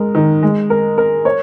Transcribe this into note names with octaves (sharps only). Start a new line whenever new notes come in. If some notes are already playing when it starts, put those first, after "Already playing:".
Already playing: G#3 A#4
D#3
G#3
A#4
A#4
C#5